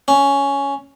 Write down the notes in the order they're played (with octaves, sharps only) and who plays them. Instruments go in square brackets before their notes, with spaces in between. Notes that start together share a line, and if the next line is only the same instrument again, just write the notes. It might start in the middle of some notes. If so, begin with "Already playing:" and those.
[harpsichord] C#4